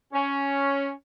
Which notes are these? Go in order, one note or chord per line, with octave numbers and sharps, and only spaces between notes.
C#4